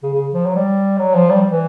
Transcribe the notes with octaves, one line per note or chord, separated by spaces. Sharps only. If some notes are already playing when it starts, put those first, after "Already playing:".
C#3
C#3
F3
F#3
G3
F#3
F3
G3
E3